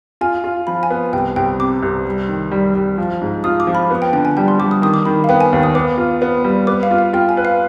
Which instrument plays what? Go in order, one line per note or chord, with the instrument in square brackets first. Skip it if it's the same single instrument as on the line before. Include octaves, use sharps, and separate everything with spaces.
[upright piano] F4 [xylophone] G#5
[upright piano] F4
[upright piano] F3 [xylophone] B5
[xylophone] G#5
[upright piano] B3
[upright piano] C2 [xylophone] G5
[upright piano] C2 [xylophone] G5
[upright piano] C3 [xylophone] D6
[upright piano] C2
G3
D#3
G3
G3
F3
G#2
[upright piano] F4 [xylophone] D#6
[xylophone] D6
[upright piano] F3
[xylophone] B5
[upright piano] B3
[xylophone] G5
[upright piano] D3 [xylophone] G5
[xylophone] G#5
[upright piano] G3 [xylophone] G5
[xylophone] C6
[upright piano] G3 [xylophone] D6
[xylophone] D#6
[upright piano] D#3 [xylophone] D#6
[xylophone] D6
[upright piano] D#3 [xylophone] B5
[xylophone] F5
[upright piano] B3 [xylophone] G5
[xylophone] G#5
[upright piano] D#2
[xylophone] D#6
[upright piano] B3 [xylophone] D6
[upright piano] F4
B3
G3
[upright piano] B3 [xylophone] D6
[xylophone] F5
[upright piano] F4
[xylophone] F5
[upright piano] F4 [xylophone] G5
[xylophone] G#5
[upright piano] B4
[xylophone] F5